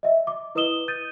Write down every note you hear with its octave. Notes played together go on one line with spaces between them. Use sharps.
D#5 E5
D6
E4 B4 D#5 D#6 E7 G7
D#6 G6 A6 D#7